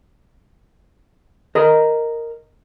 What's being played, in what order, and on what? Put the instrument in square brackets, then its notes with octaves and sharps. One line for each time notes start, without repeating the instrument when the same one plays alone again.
[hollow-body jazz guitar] A#4 D#5 A#5